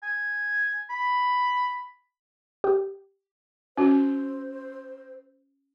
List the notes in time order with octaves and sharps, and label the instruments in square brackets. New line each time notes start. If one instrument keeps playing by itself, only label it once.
[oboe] G#5
B5
[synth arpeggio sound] G4
[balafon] C#4 F#4 [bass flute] C5